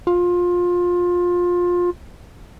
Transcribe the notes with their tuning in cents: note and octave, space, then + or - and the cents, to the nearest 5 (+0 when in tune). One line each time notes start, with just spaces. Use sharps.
F4 +20